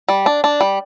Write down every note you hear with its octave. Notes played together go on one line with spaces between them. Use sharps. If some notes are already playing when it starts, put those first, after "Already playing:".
G3
D4
D4
G3